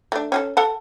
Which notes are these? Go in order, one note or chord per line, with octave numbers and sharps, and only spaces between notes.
A3 D4
C#4 G#4 A4
A4 F#5 A5